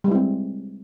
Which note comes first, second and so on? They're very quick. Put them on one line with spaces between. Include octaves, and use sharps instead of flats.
G3 G#3 E4 C4